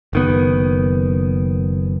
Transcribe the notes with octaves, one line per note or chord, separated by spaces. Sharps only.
F#1 D#3 B3